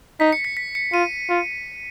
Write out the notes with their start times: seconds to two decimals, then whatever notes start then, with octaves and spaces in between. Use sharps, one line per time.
0.20 D#4 B6
0.33 C#7
0.45 B6
0.57 B6
0.75 C#7
0.92 F4 D#7
1.29 F4